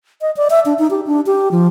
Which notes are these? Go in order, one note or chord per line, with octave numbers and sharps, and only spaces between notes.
D#5
D5
E5
D4
D#4
G4
D4
G4
F3